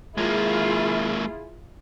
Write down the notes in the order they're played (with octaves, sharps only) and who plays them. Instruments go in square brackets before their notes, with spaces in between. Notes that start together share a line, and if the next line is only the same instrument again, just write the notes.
[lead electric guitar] G#3 A#3 [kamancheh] E4 G#4 [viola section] F4